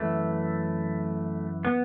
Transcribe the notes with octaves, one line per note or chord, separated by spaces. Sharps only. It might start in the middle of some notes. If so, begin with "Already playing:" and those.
Already playing: F#2 E3 A3
B3